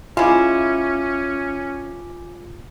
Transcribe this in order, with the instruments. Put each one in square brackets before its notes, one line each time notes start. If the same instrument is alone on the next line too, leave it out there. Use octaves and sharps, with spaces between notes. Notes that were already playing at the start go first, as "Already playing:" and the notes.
[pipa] G#3 E4 [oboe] C#4 [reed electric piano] F4 [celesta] G#5 D6